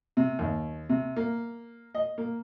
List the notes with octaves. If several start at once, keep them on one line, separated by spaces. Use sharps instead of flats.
C3
D#2
C3
A#3
D#5
A#3